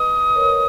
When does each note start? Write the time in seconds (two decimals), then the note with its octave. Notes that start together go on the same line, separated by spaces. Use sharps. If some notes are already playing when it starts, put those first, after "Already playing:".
Already playing: B4 D#5 D#6
0.35 A#4 C#5